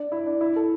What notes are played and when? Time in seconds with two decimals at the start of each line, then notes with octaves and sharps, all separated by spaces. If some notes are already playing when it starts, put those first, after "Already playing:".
Already playing: D4
0.12 E4
0.26 D4
0.41 E4
0.56 A4